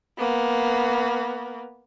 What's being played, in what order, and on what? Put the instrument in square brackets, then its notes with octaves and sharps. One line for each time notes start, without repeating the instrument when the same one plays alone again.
[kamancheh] A#3 B3